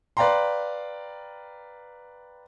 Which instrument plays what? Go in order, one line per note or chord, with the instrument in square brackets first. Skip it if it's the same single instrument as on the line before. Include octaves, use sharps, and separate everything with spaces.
[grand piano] B4 D5 F5 G5 A#5 C6